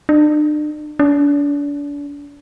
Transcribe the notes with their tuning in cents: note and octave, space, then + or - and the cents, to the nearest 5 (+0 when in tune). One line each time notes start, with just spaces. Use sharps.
D4 +40
D4 -35